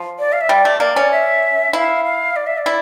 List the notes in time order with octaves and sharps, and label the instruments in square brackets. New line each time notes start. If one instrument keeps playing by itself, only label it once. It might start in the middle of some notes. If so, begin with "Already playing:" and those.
Already playing: [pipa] F3
[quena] D5
F5
E5
[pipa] G3 [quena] D5
[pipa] A3
[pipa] A#3 [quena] D5
[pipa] C#4
[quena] E5
[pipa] E4 [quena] F5
[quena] F5
D5
E5
D5
[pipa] E4